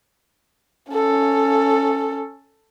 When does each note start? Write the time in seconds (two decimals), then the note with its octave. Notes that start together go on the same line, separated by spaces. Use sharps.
0.93 C#4 A4